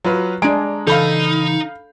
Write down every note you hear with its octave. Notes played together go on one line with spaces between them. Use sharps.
F#3 F4 B4
G#3 D4 G#5 A#5 D7
C#3 E3 D#4 A4 F5 B5 G6